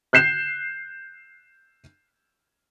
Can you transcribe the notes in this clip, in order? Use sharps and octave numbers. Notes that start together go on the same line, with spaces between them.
F#6 G6 C7 E7